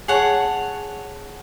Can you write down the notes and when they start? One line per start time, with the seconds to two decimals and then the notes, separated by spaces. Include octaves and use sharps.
0.08 G#4 C#5 F#5 A5